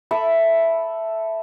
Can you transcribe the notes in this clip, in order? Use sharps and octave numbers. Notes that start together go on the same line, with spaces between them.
A4 E5 B5